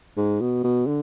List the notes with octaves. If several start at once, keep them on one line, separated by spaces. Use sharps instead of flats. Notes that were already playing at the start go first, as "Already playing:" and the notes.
G#2
B2
B2
D3